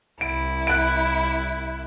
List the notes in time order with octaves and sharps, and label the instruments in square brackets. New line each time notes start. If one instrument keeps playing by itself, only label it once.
[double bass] C2 [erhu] E4 [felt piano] D7
[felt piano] F#6 D7